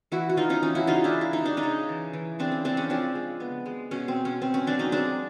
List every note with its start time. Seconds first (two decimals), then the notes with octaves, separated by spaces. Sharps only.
0.12 E3 E4 F#4
0.29 F#4
0.37 E3 D#4 F4
0.50 C#4 D#4
0.62 E3 C#4
0.75 E4 F#4
0.87 C#3 D#4 F4
1.04 D4 E4
1.13 C#3
1.21 E4
1.33 D#4
1.39 C#3
1.46 D4
1.57 C#4 D#4
1.63 C#3
1.89 E3
2.13 E3
2.39 C#3 C4 D4
2.52 C#4
2.64 C#3 C4 D4
2.77 C#4
2.90 F3 C4 D4
3.15 G#3
3.40 B3
3.66 G#3
3.91 B2 C#4
4.08 C4
4.16 B2
4.25 C#4
4.41 B2 C4
4.54 C#4
4.67 F#3 C4 D4
4.79 C#4 D#4
4.92 G#3 C4 D4